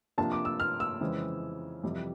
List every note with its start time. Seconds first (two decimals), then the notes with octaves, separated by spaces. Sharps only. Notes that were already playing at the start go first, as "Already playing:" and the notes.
0.18 C3 F3 A#3 D4 A5
0.32 D6
0.45 E6
0.60 F6
0.80 E6
1.01 F2 C#3 E3 G#3 C4
1.83 F2 C3 E3 G3